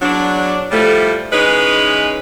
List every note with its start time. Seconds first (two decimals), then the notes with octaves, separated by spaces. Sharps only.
0.02 E2 F#3 D4
0.71 A2 F3 G3 A3
1.32 E3 G#3 C#4 D#4 B4